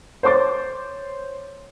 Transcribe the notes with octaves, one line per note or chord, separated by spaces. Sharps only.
C5 C#5 C6 D6 A6